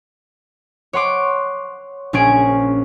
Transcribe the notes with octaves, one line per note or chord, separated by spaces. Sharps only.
C#5 F#5 C6 D6
A#1 C#4 G#4 G#6 D7